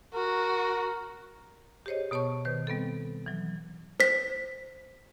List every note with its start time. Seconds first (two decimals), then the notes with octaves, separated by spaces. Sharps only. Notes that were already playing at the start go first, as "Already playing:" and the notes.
0.14 F#4 A#4
1.86 G4 G#4 C5 C#5 D#5
2.11 B2 B3 C#5 A5 C#6
2.45 D#3 B4 C5
2.67 G3 B3 C4 A4
3.26 E3 F#3
4.00 C5 B6